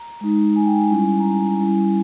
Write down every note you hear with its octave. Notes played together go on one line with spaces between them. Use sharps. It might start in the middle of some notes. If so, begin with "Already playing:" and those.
Already playing: A#5
G#3 D#4
G#5
G5
G#5
G3 C#4 E4
A#5
G#5
G3 C#4 E4